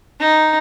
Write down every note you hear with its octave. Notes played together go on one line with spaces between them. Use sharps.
D#4